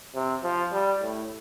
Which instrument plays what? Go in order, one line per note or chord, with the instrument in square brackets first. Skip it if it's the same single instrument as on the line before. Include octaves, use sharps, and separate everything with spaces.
[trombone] C3
F3
G3
A2